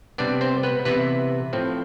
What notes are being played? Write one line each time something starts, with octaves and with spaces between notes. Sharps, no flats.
C3 G3 B3 D4 D5
C4 C5
B3 B4
C3 E3 B3 E4 B4
A2 F3 C4